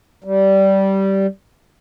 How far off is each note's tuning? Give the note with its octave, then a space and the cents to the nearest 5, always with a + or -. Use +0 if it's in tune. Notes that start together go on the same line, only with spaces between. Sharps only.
G3 -15